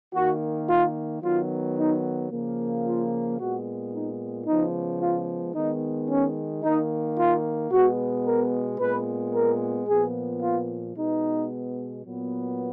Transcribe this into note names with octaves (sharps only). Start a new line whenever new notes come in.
D#3 A#3 F#4
F4
D#3 F#3 B3 F4
D#4
C#3 F3 A#3
F4
A#2 G#3 B3 F#4
D#4
C#3 F3 G#3 B3 D#4
F4
D#3 G#3 B3 D#4
C#4
D#3 A#3 D#4
F4
B2 G#3 B3 F#4
A#4
A#2 G#3 B3 B4
A#4
A#2 F3 B3 G#4
F4
B2 G#3 B3 D#4
A#2 F#3 B3